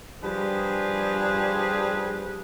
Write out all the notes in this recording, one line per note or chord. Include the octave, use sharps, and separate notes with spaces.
F3 G3 D4 G4 G#4 B4